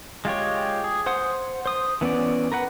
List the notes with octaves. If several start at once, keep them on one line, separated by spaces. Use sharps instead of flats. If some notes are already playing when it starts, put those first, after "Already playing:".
G#3 F4 G4 C#5
G#4
C5 F#5 D#6
C5 D#6
E3 B3 C#4 D5
A#4 B4 F#5